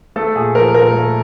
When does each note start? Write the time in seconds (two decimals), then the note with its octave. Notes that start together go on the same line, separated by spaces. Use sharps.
0.16 A3 A4
0.35 A#2 G#4
0.55 F3 A#4
0.74 A#2 A#4
0.93 A3